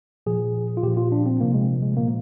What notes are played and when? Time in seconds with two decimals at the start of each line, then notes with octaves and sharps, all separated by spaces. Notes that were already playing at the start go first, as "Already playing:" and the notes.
0.26 A#2 F3 G#4
0.77 F4
0.83 A#2 F3 G4
0.97 F4
1.12 D4
1.26 C4
1.40 C3 F3 A#3
1.54 G#3
1.83 G#3
1.97 A#2 F3 A#3